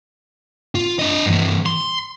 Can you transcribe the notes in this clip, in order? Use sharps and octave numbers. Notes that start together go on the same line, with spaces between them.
F4
D4 D#5
G2 E3
C6